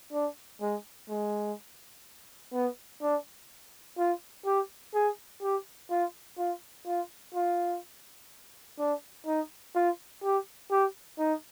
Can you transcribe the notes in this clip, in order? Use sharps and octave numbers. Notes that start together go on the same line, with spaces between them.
D4
G#3
G#3
B3
D4
F4
G4
G#4
G4
F4
F4
F4
F4
D4
D#4
F4
G4
G4
D#4